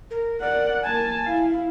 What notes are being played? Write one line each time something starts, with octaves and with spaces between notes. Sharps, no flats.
A#4
A#4 D5 F#5
A#3 G#5 A5
E4 F5